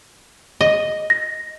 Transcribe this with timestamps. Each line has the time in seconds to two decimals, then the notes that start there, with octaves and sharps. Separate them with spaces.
0.61 D#5
1.10 A#6